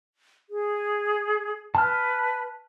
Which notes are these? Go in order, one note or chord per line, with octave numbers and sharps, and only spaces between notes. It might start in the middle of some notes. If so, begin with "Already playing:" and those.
G#4
B4 A5 F6